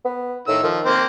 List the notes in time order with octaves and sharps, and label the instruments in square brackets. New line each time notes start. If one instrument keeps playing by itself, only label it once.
[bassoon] B3
[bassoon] A2 [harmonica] D#3 E6
[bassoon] D#3 [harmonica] F3
[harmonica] A#3 C4 C5